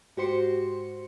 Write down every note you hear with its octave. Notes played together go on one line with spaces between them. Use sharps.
G#2 F#4 G4 C5 C6 C#7